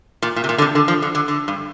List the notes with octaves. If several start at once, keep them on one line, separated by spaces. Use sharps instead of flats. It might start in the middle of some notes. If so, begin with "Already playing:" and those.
A#2
A#2
C3
A#2
D3
C3
D3
F3
D3
D3
D3
G2